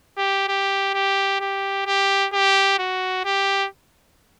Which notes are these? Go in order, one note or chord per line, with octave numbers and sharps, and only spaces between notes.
G4
G4
G4
G4
G4
G4
F#4
G4